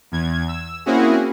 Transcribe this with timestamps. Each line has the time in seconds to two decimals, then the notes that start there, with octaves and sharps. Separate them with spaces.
0.12 E2 G#6
0.48 E6
0.86 A#3 C4 C#4 E4 F#4 G#4